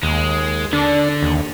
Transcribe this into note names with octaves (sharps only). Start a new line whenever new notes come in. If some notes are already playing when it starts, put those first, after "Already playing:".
D#2 G#3
D3 D4
D#2